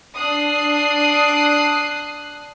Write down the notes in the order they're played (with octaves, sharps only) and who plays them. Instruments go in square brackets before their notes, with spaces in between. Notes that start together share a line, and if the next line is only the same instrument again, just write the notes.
[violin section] D4 D#6 F#6 C7